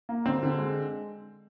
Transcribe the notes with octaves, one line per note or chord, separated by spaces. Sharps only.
A#3
D3 C4
D3
G#3